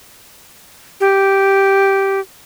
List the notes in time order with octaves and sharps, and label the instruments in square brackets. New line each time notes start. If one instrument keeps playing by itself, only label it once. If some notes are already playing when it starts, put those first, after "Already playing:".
[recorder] G4